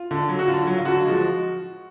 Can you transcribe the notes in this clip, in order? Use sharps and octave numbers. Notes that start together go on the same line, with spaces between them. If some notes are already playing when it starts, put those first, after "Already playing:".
Already playing: F4
D3
F#3
F#4
D3 F4
F#3
F4
D3 F#4
F3 G#3